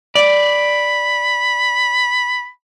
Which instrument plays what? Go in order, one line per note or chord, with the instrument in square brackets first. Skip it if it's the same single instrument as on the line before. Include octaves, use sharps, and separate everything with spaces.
[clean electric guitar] D5 [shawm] B5